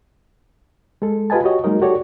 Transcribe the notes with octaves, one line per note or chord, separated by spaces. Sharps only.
G#3 A4
F4 G4 B4 D#5 G#5 A5
F#4 G4 C#5 D#5
F#3 G#3 A#3 D#4 A#4 D#5
F#4 G4 A4 C#5 D5